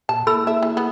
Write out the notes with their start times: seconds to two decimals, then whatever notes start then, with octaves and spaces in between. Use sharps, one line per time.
0.09 A#2 A5
0.27 A#3 E4 G#4 A4 B5 E6
0.47 E5
0.63 E3
0.77 B3